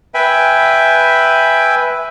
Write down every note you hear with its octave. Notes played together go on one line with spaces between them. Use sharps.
B4 E5 G5 G#5 B5